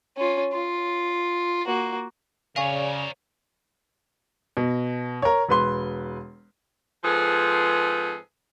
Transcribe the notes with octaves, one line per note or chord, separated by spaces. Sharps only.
C#4 F4
F4
A#3 F#4
C#3 A#4 C#5 D5 F5 G#5 C#6
B2
A#4 C#5
E1 B4 C6
G#2 F3 C4 G#4 A4 B4